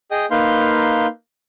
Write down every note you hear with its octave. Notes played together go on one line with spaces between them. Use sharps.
G#4 D#5 G5 D#6
A#3 D#4 B4 F5 C6 G6